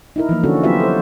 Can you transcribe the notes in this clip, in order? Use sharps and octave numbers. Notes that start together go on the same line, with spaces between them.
D#4 E4 A#4
E3 F3 A#3
D3 C#4 D4 F#4 A4
F#3 B3 E4 F4 G4 E5
A4 C5